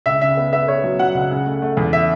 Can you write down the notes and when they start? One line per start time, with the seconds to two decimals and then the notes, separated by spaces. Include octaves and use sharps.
0.06 C#2 E5
0.21 C#3 E5
0.37 B3
0.53 B3 E5
0.68 B3 C#5
0.84 F#3
0.99 F#3 F#5
1.15 C#2
1.30 C#3
1.46 A3
1.62 A3
1.77 E2
1.93 E5